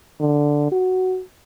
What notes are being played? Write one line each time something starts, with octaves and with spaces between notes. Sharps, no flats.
D3
F#4